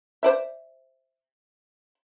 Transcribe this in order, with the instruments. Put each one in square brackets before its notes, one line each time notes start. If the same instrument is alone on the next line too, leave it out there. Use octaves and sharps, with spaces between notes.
[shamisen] C5 D5 E5